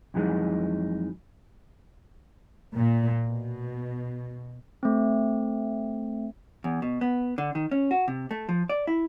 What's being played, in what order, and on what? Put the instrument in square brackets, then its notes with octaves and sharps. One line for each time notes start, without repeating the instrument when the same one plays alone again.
[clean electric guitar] F2 E3 F#3 G#3 D#4
[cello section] A#2
B2
[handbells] A3 C4
[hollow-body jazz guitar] E2
B2
B3
D3
D#3
C#4
F#4
C3
A3
F3
D5
E4